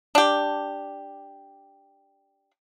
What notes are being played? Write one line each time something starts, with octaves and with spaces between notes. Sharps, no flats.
D4 G4